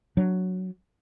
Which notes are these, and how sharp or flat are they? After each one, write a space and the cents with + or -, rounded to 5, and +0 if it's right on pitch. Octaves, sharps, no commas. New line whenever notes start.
F#3 +0 D4 +0